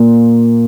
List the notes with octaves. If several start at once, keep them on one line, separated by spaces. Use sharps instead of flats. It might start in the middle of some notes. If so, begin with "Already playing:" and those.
Already playing: A#2